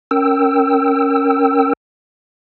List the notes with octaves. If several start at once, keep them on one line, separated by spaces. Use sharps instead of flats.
C#4 A#4 G5 E6